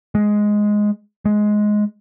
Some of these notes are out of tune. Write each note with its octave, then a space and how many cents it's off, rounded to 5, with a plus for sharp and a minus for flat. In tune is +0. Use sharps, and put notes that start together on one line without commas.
G#3 +5
G#3 +10